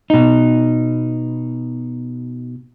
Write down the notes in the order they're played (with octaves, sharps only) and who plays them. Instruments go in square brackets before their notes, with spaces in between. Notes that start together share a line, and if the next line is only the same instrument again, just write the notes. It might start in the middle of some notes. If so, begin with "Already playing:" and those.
[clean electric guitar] B2 D#4